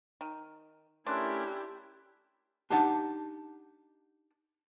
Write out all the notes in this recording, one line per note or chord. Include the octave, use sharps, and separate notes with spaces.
D#3
A3 C#4 D4 E4 G4 A#4 C6 F#6
D4 D#4 G4 F#5 A5